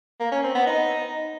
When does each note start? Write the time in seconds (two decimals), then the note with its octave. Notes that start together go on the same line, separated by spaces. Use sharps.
0.20 A#3
0.32 C#4
0.43 C4
0.55 B3
0.67 D#4